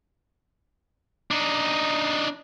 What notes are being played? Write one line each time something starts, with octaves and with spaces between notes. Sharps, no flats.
D4 D#4